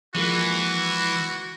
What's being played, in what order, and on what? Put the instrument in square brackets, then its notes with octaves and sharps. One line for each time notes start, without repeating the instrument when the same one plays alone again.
[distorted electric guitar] E3 [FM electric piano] F3 G#3 A#3 [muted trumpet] F#4